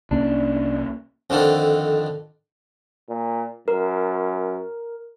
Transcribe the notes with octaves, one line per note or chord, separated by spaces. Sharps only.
C2 A#3 C#4 D4
F2 D3 D#3
A#2
F#2 A#4